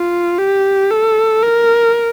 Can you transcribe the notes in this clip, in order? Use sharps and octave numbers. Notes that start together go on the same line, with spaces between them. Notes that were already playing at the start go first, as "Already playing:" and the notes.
Already playing: F4
G4
A4
A#4